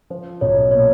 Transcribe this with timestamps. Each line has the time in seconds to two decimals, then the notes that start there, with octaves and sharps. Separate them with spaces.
0.10 F3 C5
0.41 B1 C#5
0.71 A#2 C#5